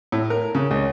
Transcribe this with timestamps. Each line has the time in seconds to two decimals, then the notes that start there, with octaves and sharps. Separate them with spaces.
0.12 A2
0.30 A#4
0.55 C#3
0.71 C#2